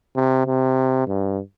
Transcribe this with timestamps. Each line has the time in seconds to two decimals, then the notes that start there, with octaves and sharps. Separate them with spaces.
0.16 C3
0.47 C3
1.07 G2